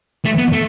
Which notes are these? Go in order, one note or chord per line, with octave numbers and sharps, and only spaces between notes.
A3
B3
A3